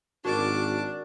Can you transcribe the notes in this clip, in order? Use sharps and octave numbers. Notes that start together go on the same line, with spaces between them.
G#1 D4 F#4 A#4 D5 A5 D6